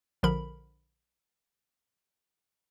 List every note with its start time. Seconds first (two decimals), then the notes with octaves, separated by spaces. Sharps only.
0.23 A#1 D3 F3 A#4 B5